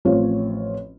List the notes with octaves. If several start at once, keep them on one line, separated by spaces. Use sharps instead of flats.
A1 F3 C4 F4 C#5